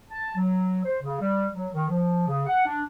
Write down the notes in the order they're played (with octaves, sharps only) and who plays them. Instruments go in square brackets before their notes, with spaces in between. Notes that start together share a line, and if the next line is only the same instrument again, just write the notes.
[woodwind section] A5
F#3
C5
C#3
G3
F#3
D#3
F3
C#3
F#5
D4